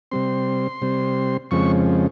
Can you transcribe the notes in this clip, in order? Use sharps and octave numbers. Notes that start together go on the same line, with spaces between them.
C3 G3 C4 C6
C3 G3 C4
F2 C#3 F3 G#3 C4 C#6